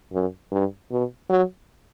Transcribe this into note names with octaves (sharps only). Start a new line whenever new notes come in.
F#2
G2
B2
F#3